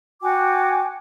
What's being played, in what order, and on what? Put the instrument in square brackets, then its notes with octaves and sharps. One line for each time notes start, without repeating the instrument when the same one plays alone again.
[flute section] F#4 G5 G#5 D6